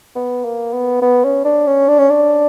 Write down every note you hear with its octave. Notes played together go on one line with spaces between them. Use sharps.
B3
A#3
B3
B3
C#4
D4
C#4
D4
C#4
D4